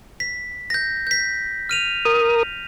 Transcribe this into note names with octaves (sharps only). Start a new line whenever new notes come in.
B6
G6 A#6
G6 B6
F6 D#7 F7
A#4 D#6